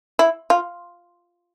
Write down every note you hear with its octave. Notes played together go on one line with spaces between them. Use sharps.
E4
F4